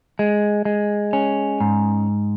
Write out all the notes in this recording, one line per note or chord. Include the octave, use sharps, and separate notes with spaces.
G#3
G#3
C#4
G#2